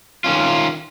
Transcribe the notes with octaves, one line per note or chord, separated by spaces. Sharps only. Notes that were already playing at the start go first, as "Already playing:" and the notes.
D#3 C#4 F4